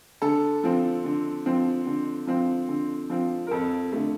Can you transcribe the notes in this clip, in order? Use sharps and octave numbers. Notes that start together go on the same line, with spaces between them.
D3 A4
F3 C4
D3
F3 C4
D3
F3 C4
D3
F3 C4
A#4
F2 A4
D3 A3